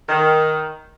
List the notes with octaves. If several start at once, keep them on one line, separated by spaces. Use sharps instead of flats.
D#3